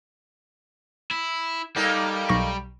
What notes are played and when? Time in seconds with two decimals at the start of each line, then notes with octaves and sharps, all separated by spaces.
1.11 E4
1.76 G3 A#3 D#4 A4
2.29 B1 C#6 A#6